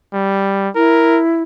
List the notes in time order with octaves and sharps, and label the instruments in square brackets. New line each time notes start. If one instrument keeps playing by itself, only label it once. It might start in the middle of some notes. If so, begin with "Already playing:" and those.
[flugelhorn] G3
[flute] E4 [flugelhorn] A#4